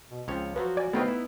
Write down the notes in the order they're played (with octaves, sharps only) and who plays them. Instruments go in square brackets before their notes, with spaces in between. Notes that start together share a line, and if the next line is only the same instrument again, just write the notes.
[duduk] B2
[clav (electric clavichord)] C#2 F3 C#5 [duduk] C4
[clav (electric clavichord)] F3 F#3 [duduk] F#4 [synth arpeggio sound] B4
[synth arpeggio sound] D5 G#5
[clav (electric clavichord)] D#3 C4 F4 [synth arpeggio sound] A3 [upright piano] B3 D#4
[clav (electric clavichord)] E4